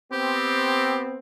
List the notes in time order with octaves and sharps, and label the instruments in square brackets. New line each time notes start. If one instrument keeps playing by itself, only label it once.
[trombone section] B3 C4 [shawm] G4